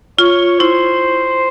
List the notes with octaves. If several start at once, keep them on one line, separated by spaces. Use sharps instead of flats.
F4 C#5
E4 C5